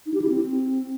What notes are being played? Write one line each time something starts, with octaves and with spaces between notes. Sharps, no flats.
D#4
G4
E4
C4